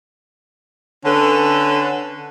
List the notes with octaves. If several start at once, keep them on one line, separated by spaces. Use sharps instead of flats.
D3 C#4 A4 B4